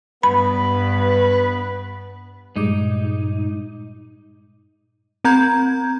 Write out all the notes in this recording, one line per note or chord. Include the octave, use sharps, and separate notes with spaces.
G2 B3 B4 B5
G2 A#2 G3 G#3 D#4 D6
C4 A#5 G6 G#6